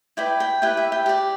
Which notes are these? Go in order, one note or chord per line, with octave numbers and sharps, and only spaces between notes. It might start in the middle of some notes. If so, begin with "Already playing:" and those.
E4 B4 D5 G5
G5
E4 G4 B4 G5
E5
G5
G4 D5